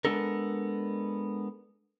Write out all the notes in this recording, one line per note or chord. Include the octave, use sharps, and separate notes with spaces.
G#3 B3 C4 D4 A4 A#4